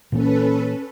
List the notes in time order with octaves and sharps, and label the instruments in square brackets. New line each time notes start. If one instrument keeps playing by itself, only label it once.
[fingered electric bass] A#2 E3 A#3 [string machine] C#4 A4 B4